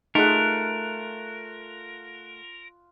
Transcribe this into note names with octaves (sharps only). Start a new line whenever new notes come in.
A3 D#4 F4 G#4 A#4 F#5